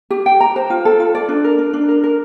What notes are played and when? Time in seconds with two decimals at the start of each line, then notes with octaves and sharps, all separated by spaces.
0.10 G4
0.26 G5
0.40 A#5
0.56 C5
0.70 F4
0.85 A4
1.00 F4
1.15 D5
1.29 D4
1.44 A#4
1.58 D4
1.73 D4
1.89 A#4
2.03 A#4